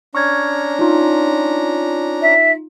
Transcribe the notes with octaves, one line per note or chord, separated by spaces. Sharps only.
C#4 D4 A#5 C#6 F6 G#6
D#4 F4
E5